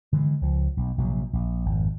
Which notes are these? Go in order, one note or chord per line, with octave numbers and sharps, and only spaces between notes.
D3 E3 G3 G#3
C#2 F3
B1
A#1 C3 F#3
A#1
G#1 F2